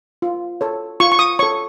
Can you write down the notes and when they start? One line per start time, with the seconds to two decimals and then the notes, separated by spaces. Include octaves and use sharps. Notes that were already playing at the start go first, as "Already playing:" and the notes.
0.22 F4
0.61 A4 C#5
1.00 F4 C#6
1.12 C#6
1.19 D#6
1.39 A4 C#5 C#6